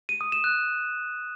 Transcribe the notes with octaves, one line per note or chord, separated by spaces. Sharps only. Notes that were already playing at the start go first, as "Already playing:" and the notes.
D#7
D#6
E7
F#6